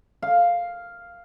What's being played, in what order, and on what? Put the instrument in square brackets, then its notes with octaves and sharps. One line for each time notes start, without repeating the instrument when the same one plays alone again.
[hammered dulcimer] F5